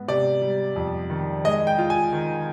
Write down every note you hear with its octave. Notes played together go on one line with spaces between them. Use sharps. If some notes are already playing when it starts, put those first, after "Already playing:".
Already playing: G#2 B3
C3 D5
G3
F2
D#3
G#3 D#5
G5
F4
G#5
D#3